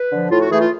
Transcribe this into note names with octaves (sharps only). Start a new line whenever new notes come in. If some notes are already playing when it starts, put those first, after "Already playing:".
Already playing: B4
D3 F3
A2 F4
F#4
E3 A3 G#4
F4